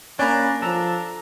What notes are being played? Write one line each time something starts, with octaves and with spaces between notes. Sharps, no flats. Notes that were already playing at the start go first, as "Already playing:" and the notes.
A#3 C#4 D4 C#5 D5 G#5 A#5 B5
F3 D4 A4 A#5 E6